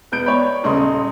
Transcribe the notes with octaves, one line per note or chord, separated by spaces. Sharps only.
E1 B3 G6 D7
C#5 D5 B5
D#1 C#3 D#5 C6 D#6